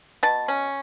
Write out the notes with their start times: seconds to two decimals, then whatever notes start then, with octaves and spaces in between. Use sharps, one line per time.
0.23 B2 A5
0.48 C#4